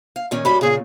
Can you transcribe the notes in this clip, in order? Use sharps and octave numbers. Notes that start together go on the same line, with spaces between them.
F5
A#2 D#3 C#4
F#2 F#3 G3 B5
A#2 C#3 G#4